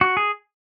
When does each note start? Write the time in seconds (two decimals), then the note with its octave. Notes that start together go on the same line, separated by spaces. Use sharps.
0.01 F#4
0.17 G#4